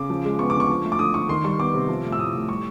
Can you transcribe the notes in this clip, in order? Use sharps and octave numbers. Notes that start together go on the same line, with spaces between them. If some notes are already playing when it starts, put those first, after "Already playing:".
Already playing: C#3 D6
F3
G#3
B3 C#6
D3 D6
C#6
F3
A3
D6
D3 D#6
D3 C#6
D#3 C6
G3 C#6
B3 D6
C3
F3
A3
E6
A2 D#6
A2
G3 C#6